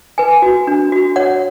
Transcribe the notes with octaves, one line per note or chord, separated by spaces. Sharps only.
B4 G#5
F#4
D4
F#4
C#5 F#5